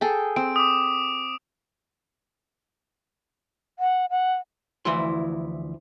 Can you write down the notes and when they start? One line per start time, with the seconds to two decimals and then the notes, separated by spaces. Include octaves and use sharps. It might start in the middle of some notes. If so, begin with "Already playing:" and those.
0.01 G#4 A4 G5
0.36 C4 D7
0.56 D6 D#6
3.79 F#5
4.11 F#5
4.85 D2 E3 F3 E4 C6